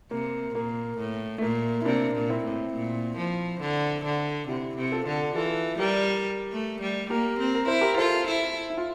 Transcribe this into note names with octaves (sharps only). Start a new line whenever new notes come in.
C3 A#3
A#2 A#3
A2
A3
A#2 A#3
E4
C3 A#3 D4
A#2
C4 E4
A2
A#2
F3
D3
D3
C3 E4 G4
C3
F4 A4
D3
E3 F4 A4
G3 G4 A#4
A3
G3
A#3 G4 A#4
C4
A#4
E4 C5
G4 A#4
F4 A4 C5
E4
E4
F4